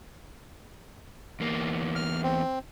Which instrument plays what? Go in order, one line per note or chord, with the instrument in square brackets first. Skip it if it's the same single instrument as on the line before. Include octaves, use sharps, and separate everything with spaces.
[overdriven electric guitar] E2 A#3
[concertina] F6
C4